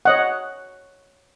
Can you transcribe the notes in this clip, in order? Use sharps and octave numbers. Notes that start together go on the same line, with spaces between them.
C#5 D#5 F#5